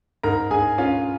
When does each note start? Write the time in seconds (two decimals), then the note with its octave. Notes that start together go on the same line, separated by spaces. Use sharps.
0.23 G#2 A#4 A#5
0.51 G#2 G#4 G#5
0.78 C#4 F4 F5